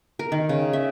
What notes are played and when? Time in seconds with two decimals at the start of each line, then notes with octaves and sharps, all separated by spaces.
0.19 A#4
0.32 D#3
0.49 C#3
0.73 E5